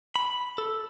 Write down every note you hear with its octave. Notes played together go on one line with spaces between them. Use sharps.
B5
A4